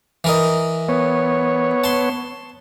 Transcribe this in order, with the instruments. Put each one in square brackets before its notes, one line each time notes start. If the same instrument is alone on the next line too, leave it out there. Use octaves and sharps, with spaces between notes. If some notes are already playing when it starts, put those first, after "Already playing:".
[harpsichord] E3 A#4 D#5
[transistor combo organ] B3 C#5
[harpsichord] A5 C6